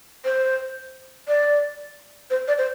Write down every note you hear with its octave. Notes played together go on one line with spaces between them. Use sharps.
C5
D5
C5
D5
C5